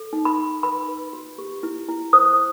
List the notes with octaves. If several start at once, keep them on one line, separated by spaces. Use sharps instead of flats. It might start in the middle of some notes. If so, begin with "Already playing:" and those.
Already playing: A4
D#4
B5
D#4
B4 B5
B4
F#4
G4
E4
E4
C5 D#6